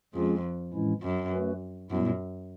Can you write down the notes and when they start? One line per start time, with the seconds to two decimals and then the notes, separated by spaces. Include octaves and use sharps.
0.14 F2 F3 G#3 C#4 F4 G#4
0.73 A2 E3 G#3 C#4 E4
1.02 F#2
1.32 A3 C#4 F#4 B4
1.90 F#2 A#2 G3 B3 E4